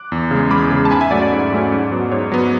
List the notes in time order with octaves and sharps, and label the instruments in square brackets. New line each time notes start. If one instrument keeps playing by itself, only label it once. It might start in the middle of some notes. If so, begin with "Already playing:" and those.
Already playing: [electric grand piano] D6 F#6
E2
C#3 G#3
E2 B5 D6
C#3 G#3
A5
G#2 G#5 B5
E5 G#5
F#3 A3 C#4 D5 F#5
D5
G#2
F#3 A3 C#4
G#2
F#3 B3
G#2 C#5
F#3 B3